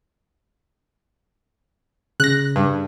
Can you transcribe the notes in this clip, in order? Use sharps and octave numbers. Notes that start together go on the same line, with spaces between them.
C#3 F#6 A#6
G2